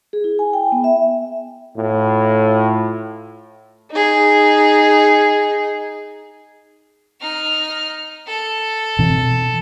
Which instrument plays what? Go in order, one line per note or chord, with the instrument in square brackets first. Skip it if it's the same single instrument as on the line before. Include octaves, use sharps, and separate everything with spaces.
[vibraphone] G#4
E4
G#5
G5
B3
E5
[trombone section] A2 F4
[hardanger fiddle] D#4 G#4
[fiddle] D#4 F6
A4
[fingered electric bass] B2 E3 C4